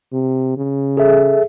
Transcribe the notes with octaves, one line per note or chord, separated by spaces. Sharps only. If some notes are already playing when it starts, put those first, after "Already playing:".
C3
C#3
G#4 A4 E5